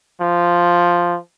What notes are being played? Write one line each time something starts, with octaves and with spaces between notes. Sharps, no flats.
F3